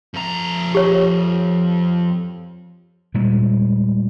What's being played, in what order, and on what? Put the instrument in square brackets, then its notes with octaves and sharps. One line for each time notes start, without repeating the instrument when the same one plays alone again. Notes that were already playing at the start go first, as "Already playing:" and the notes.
[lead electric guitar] F2 A#5
[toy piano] G4 C#5
[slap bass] A#2 G3 G#3